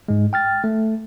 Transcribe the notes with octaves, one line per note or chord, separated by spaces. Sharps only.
G#2 G#3
G5 F6 A6
A3